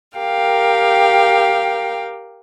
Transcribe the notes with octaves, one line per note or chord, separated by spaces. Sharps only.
G4 A#4 F5 G5